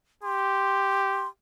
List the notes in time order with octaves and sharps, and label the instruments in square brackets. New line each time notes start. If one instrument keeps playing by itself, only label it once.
[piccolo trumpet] G4 [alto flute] C6